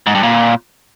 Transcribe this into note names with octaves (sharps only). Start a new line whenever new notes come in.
G#2
G2
A#2